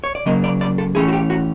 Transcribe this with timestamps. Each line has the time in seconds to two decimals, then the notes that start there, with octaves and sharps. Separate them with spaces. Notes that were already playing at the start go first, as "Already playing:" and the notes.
0.04 C#5
0.15 D5
0.26 C#3 F#3 A#3 D#5
0.44 D5
0.61 D5
0.78 A4
0.95 A2 E3 A3 C#4 G#4
1.08 F#4
1.13 G4
1.30 F#4